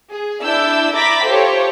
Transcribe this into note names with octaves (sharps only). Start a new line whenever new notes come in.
G#4
D4 E4 D5 E6 G6
E5 A#5 B5 D6 A6 B6
F4 G4 A4 C5 C#5